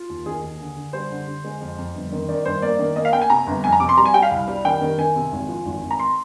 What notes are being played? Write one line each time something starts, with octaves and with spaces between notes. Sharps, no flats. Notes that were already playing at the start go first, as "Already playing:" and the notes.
Already playing: F4
D#2
D#3 G#4
D#2
D3
D3
G3 C5
D3
D3
G#3
F2
F2
G1
D#3
D#3 D5
G2 C5
A#3 D5
D#3
A#3 D#5
F5
A#3 G5
G#5
C3 A#5
G1
F2 G#5
A#5
C3 D6
C6
G3 A#5
G#5
G3 G5
F5
C2
G3
D#3 G5
D#3
D#3 G#5
C3
G#1
F3
G#1
G#1
A#5
C6